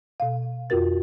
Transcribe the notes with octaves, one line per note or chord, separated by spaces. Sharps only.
B2 F5
F2 F4 F#4 A#4 A6